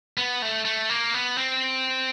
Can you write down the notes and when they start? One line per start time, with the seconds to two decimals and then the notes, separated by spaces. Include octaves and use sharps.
0.18 B3
0.42 A3
0.65 A3
0.90 A#3
1.14 B3
1.38 C4